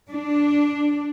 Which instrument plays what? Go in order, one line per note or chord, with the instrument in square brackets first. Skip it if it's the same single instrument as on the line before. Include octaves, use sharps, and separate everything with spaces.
[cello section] D4